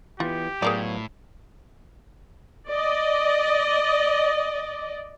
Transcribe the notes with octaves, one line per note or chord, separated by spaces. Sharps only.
E3 A#3 B3 F4 G4
A2 F#3 B3 F4 G#4 A#4 D5
D5 D#5